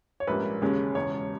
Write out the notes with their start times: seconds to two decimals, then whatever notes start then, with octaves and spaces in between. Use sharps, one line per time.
0.20 C#5
0.27 A#1 G#2 G3 A#3 C#4 B4
0.62 E1 D#2 C#3 G#3 C#4
0.95 E1 E2 C#3 C#5